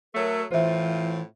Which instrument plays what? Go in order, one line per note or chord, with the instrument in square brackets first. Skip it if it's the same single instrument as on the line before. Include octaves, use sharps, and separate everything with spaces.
[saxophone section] F#3 A3 [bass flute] A#4
[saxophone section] A2 C4 F4 [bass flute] E3 [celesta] C5 E5